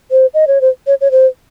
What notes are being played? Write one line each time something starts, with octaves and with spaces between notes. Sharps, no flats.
C5
D#5
C#5
C5
C#5
C#5
C5